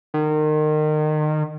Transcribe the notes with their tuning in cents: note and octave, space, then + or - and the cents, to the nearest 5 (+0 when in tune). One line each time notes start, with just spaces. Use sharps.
D#3 -30